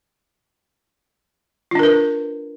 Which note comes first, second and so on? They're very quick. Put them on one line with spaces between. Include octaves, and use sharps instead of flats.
F4 D4 A#4 B4